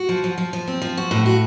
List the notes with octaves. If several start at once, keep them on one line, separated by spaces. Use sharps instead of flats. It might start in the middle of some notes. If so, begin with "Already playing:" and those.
Already playing: F#4
F3
F3
F3
F3
C4
F3
F#4
A2
F#4